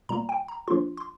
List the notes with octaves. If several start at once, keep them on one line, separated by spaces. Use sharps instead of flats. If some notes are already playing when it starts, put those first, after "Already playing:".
A#2 G3 A#3 A#5
G5
A#5
F3 A#3 D4 F4 C6
C6